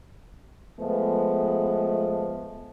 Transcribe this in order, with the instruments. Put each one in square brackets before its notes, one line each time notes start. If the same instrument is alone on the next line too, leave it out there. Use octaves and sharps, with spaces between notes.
[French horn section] F3 G#3 A3 B3